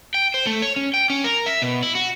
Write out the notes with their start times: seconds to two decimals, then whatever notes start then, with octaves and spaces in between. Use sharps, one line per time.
0.14 G5
0.34 C5
0.46 A3
0.62 C#5
0.76 C#4
0.94 G5
1.10 C#4
1.24 A#4
1.46 E5
1.62 B2
1.83 E4
1.95 F#4